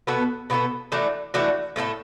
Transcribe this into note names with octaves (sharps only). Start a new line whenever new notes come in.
B2 B3 F#4 A4
B2 B3 F#4 A4
E3 A3 D4 F#4
E3 A3 D4 F#4
A2 A3 E4 A4